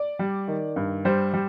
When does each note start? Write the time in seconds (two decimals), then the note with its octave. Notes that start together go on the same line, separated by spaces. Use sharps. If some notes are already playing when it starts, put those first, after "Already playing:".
Already playing: D5
0.19 G3
0.48 D#3
0.76 G2
1.05 G3 C5
1.34 G3